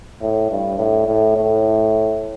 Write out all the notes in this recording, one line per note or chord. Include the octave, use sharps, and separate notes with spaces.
A2
G2
A2
A2
A2